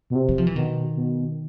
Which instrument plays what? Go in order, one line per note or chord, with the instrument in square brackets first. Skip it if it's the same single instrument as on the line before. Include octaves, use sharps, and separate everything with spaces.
[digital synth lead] B2
C3
[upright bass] F#3
F3
E3
[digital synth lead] B2 [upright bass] D#3
[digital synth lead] B2